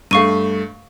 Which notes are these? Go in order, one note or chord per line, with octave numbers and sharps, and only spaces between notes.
G2 A3 F5 C#6 D#7